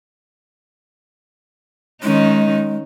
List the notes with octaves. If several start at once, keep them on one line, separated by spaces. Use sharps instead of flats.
D#3 G#3 C#4 D#4